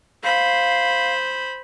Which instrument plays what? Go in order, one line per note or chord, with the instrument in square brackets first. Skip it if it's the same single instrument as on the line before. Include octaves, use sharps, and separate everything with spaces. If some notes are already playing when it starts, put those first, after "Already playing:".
[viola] C5 B5 [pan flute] F5